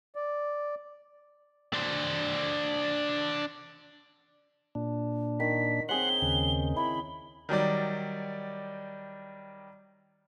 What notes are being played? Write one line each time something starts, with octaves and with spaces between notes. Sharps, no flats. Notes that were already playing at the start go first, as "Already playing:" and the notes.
D5
D4 C5
A#2 D4
D#3 B6
C4 G#4 C#5 F#5 C6 F#6 G7
D#2 C#3
E4 B5
D#3 F#3 G3 D5